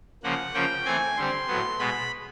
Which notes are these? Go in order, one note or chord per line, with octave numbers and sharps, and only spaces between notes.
C#3 F3 A#3 F#5
C#3 F3 A#3 C#4 G5
E3 A3 C4 G#5
D3 G3 C4 C6
A2 F#3 B3
B2 G#3 B3 B5